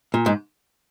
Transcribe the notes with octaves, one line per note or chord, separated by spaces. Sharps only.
A#2
G#2